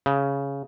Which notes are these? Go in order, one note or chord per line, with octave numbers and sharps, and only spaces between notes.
C#3